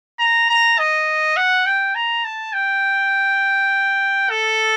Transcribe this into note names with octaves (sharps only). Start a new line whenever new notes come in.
A#5
A#5
D#5
F#5
G5
A#5
A5
G5
A4